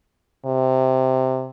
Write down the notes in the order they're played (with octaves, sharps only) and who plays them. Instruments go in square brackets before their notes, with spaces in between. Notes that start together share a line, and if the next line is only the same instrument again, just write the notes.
[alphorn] C3